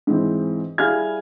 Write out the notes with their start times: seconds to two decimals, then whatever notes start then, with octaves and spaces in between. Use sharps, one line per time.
0.07 G#2 E3 C4
0.78 G3 E4 G#4 F5 F6 G#6